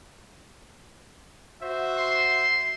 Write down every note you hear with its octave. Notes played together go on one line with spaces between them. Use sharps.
F#4 C5 E5
C6